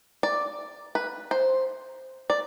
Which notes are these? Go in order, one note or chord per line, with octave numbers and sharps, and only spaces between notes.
D5
B4
C5
D5